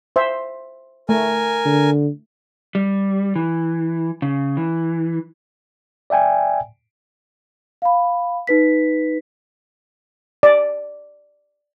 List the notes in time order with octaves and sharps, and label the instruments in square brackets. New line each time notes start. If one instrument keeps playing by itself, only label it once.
[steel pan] C5 E5
[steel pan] A3 [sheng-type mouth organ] A#4 G#5
[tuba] D3
[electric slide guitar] G3
E3
C#3
E3
[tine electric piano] D5 E5 G5 G#5
[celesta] F5 B5
D#4 B4 B6
[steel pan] D5